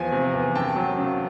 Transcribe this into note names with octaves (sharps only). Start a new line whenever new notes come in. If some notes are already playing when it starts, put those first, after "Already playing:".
Already playing: E2 F3 G#5
C3
E2
F#2 G5 A5
F#3
C#3